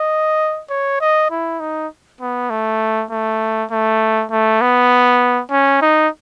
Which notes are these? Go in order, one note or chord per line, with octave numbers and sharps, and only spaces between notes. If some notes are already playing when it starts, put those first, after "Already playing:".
Already playing: D#5
C#5
D#5
E4
D#4
B3
A3
A3
A3
A3
B3
C#4
D#4